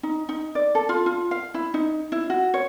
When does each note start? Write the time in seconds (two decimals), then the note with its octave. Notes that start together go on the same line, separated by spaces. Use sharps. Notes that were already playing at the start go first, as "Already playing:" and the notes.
0.03 D#4
0.29 D#4
0.55 D5
0.75 A4
0.89 F4
1.06 F4
1.31 F5
1.54 E4
1.74 D#4
2.12 E4
2.30 F#4
2.54 C#5